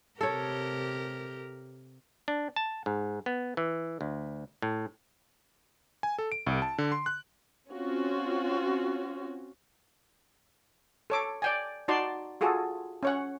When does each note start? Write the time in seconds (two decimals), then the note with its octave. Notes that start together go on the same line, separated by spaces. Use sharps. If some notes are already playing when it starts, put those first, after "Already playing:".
0.21 C3 G4 A4 A#4 C#5
2.28 D4
2.56 A5
2.86 G#2
3.26 B3
3.57 E3
4.01 D2
4.62 A2
6.03 G#5
6.19 A4
6.32 D7
6.47 C2
6.62 A5
6.78 D3
6.92 C6
7.06 F#6
7.72 C4 C#4 F4 F#4
11.10 A4 C#5 D6
11.42 D5 G5 G#5
11.88 D#4 F#4 D5 A5 C6
12.41 F4 F#4 G#4 A4
13.03 C#4 C#5 F#5